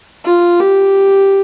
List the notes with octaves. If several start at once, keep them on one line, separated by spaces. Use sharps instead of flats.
F4
G4